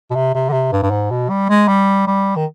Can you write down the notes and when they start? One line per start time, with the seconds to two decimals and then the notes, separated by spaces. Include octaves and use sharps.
0.10 B2
0.15 C3
0.34 C3
0.49 D3
0.53 C3
0.72 G2
0.83 G2
0.91 G#2
1.11 B2
1.30 G3
1.49 G#3
1.68 G3
2.07 G3
2.36 D#3